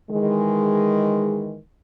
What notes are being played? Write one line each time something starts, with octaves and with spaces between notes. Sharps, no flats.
D#3 E3 G#3